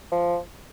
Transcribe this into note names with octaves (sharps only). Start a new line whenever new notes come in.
F3